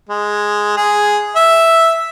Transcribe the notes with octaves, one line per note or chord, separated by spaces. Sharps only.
G#3
G#4
E5